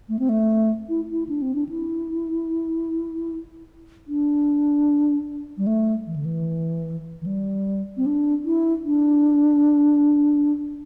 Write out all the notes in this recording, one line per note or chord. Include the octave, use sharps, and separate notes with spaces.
A3
C4
A3
E4
E4
D4
C4
D4
E4
D4
G3
A3
E3
D3
E3
E3
G3
C4
D4
E4
D4